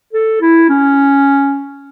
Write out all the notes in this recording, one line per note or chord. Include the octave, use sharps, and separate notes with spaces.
A4
E4
C#4